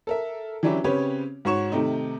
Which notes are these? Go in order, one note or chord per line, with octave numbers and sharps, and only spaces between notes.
A4 A#4 E5
E3 F#3 C#4 D4 E4 G4
C#3 C4 C#4 G4 B4 C#5
G#2 F#4 C#5 C#6 E7
C3 D#3 A3 D#4